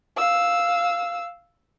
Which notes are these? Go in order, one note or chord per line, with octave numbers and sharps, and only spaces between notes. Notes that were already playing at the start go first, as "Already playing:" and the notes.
F5 E6